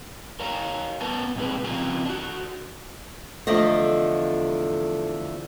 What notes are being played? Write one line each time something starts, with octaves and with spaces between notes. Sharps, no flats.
A#4 C#5 F5 A#5
B3 A#4 B4 A5
A#2 G#3 C4 G#4 B4
C#3 F3 C4 F4 A#4 G#5
D4 F#4
E2 D3 F3 A3 D#5